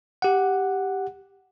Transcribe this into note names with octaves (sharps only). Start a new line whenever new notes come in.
G4 F#5